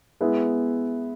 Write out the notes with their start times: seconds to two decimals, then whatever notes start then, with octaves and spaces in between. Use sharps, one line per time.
0.21 G#3 B3 E4